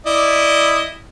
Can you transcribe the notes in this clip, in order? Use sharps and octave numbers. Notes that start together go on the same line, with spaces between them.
E4 D5 D#5